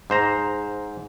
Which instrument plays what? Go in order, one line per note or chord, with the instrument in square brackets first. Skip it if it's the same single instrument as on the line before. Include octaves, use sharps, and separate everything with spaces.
[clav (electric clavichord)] G#2 C5 A#5